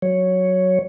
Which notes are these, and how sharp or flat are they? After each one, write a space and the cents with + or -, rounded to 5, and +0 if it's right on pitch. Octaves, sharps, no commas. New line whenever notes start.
F#3 -5 C#5 +0